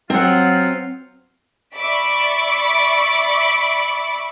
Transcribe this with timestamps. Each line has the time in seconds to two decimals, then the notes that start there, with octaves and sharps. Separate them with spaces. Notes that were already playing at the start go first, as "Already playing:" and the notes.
0.10 F#3 C4 F4 F#5
1.75 D5 E5 B5 C#6 D6